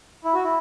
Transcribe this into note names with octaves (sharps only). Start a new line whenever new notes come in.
E4
F#4
E4